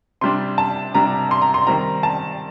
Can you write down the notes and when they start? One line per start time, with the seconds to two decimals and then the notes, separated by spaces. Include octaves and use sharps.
0.21 C3 G3 D4 C6
0.58 A5
0.94 C3 G3 D4 A#5
1.31 C6
1.42 A#5
1.54 C6
1.67 D#3 G3 C4 A#5
2.03 A5